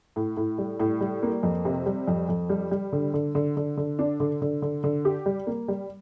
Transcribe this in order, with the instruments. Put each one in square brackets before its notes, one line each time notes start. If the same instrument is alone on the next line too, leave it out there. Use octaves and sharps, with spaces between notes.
[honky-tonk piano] A2
A2
G3
A2
G3
A#3
F2
C3
G3
F2
F2
G3
G3
D3
D3
D3
D3
D3
D4
D3
D3
D3
D3
G4
G3
A#3
G3